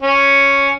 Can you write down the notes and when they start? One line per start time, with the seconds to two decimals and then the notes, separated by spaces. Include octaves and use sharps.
0.02 C#4